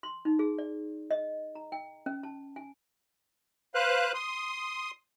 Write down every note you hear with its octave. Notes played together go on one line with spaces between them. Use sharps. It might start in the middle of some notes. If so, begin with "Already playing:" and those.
C6
D#4
G#4
D5
D#5
A#5
G5
C#4
A5
G#5
B4 C5 F5 F#6
C6 D#6